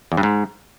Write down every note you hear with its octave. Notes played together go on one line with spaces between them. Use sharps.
E2
G2
G#2